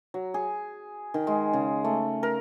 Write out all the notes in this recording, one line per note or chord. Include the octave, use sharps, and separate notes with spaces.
F#3
G#4
D#3
G#3
C#3
A3
A#4